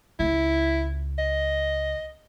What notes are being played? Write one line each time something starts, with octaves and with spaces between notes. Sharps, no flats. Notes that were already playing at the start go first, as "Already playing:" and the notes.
C#2 E4
D#5